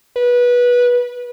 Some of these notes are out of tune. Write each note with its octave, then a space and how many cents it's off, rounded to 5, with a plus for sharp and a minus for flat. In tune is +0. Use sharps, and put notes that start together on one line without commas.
B4 -20